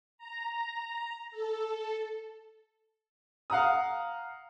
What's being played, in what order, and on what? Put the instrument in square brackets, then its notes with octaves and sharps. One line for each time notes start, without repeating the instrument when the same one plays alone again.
[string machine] A#5
A4
[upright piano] F5 F#5 A#5 D#6